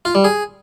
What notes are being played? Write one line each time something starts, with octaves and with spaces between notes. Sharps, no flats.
F4
G3
G#4